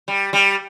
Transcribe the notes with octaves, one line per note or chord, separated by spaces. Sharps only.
G3
G3